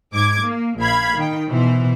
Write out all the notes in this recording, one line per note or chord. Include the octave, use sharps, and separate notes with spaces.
G#2 D6 G#6
A#3
A#1 F5 B5 G#6
D#3 G5
B2 E3 C5